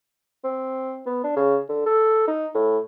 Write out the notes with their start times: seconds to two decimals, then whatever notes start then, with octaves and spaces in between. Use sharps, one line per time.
0.44 C4
1.06 B3
1.24 D4
1.36 C#3
1.69 D3
1.86 A4
2.28 D#4
2.54 A2